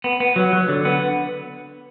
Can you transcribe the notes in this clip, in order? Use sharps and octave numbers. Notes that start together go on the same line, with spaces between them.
B3
B3
F#3
F#3
D3
B3